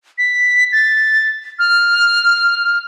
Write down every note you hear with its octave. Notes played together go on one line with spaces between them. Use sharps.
B6
A6
F6